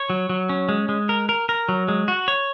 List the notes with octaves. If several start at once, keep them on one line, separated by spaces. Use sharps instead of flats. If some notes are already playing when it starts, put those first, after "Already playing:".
Already playing: C#5
F#3
F#3
C#4
G#3
G#3
A#4
A#4
A#4
F#3
G#3
F#4
C#5